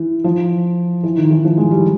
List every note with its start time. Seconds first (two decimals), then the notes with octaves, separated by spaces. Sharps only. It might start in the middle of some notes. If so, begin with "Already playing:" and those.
Already playing: E3
0.24 F3
1.03 E3
1.17 D#3
1.31 E3
1.44 F3
1.57 G#3
1.71 G3